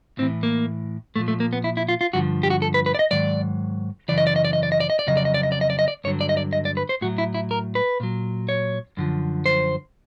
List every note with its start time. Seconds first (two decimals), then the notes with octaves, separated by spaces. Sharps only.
0.18 A2 C4
0.22 E3
0.43 A#3
1.16 A#2 F3 A3
1.28 A3
1.40 A#3
1.53 B3
1.64 E4
1.77 E4
1.89 F4
2.01 F4
2.13 G2 D3 F3 F#4
2.43 G4
2.50 F#4
2.62 A4
2.74 B4
2.86 B4
2.95 D5
2.99 D#5
3.11 G#2 D#3 F#3 D5
4.08 F#2 C#3 E3 D5
4.18 D#5
4.27 D5
4.36 D#5
4.45 D5
4.53 D#5
4.63 D5
4.72 D#5
4.80 D5
4.90 D#5
4.99 D5
5.07 F2 C#3 F#3 D#5
5.17 D5
5.25 D#5
5.34 D5
5.43 D#5
5.52 D5
5.61 D#5
5.70 D5
5.79 D#5
5.88 D5
6.04 G2 D3 F#3 C#5
6.21 D5
6.29 D#5
6.37 D5
6.53 D#5
6.65 D5
6.77 B4
6.89 C5
7.01 A2 F#3 F#4
7.18 E4
7.34 E4
7.51 A#4
7.75 B4
8.00 A#2 F#3
8.49 C#5
8.97 F#2 D3 F3
9.46 C5